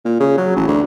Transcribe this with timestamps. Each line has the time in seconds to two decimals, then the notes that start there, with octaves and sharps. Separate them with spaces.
0.05 A#2
0.20 C#3
0.37 F#3
0.56 A1
0.68 D2